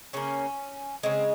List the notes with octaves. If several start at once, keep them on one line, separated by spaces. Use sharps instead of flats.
C#3 G3 A#3 C#4
C#3 G#3 C4